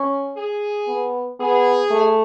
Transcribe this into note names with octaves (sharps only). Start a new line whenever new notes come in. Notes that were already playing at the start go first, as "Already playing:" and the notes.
Already playing: C#4
G#4
B3
B3 G#4
A3